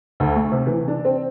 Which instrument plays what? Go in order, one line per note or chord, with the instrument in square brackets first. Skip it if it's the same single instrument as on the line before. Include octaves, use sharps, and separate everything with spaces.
[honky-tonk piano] D2
A3
C3
E3
D4
C4